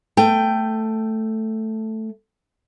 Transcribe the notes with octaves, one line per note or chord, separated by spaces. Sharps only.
A3 G5